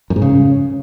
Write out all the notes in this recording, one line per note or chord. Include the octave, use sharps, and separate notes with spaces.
F#2
G#2
C#3